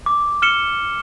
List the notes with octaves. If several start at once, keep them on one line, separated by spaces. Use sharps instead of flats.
D6
F6 C#7 E7 G7